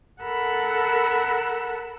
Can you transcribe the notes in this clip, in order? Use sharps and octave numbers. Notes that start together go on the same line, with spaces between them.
A4 A#4 F#5 B5 E6